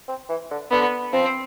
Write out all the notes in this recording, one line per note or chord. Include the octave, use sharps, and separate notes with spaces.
C4
E3
D3
D3 B3
F3 C4